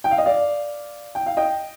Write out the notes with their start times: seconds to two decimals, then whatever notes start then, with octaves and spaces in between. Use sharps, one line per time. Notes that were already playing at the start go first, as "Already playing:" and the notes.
0.04 G5
0.11 F5
0.18 D#5
0.26 D5 F5
1.15 G5
1.26 F5
1.37 D#5 G5